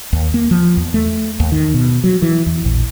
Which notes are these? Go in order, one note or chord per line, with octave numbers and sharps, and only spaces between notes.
D#2
A#3
F3
E2
A3
D#2
D#3
B2
F#3
E3
E2
A#1